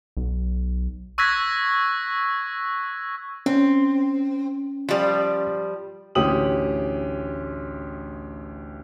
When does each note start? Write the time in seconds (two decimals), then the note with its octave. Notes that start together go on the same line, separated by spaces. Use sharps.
0.17 B1
1.18 C#6 E6 F#6 G#6 A#6 B6
3.46 C4 C#4
4.89 F3 G3
6.15 A1 D2 C#4 G4 D#6 F#7